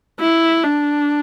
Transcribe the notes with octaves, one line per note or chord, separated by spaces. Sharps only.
E4
D4